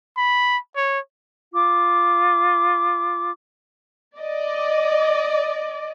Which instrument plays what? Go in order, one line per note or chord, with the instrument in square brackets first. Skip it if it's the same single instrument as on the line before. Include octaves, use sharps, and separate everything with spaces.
[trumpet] B5
C#5
[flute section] F4 D6
[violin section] D5 D#5